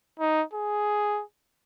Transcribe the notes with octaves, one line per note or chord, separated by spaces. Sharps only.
D#4
G#4